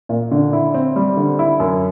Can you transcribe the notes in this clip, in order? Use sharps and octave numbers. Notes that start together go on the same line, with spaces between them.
A#2
D3
E4
C4
G3
D3
E4
F#2